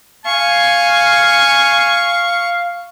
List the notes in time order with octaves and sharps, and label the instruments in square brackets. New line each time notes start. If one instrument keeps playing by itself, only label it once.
[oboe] F5 [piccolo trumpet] G#5 [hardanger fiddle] C#6